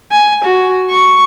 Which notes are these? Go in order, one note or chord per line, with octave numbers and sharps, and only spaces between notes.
G#5
F#4
C#6